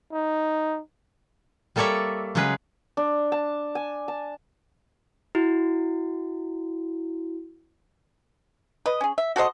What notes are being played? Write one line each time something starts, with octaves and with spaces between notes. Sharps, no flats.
D#4
G3 A#3 A4 C#5 D5 E5
C#3 F#3 G#3 G#4 B4
D4
A5
G#5
A5
E4 F#4
B4 D#5
C#4 G#4
E5
F#4 A4 C5 D#5